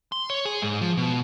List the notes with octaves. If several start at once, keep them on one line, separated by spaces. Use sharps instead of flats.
C6
C#5
G#4
G#2
F3
B2